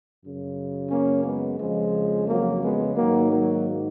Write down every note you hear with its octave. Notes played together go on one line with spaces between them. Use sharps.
F#2 C#3
A#3 C#4
G#3 B3
F2 C#3 F3 G#3
F#3 A#3
G#3 B3
G#2 D#3 F#3 A#3
F#3 A#3